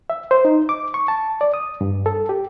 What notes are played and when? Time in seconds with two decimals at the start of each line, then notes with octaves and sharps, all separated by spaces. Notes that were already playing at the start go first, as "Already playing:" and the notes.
0.10 E5
0.31 C5
0.45 D#4
0.69 D6
0.94 C#6
1.08 A5
1.41 D5
1.54 D#6
1.81 G2
2.06 A4
2.29 G4